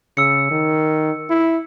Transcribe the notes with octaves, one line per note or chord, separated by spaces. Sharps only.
C#3 E6 C#7
D#3
E4